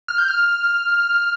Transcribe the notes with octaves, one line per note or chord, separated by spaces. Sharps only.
F6
G6
F6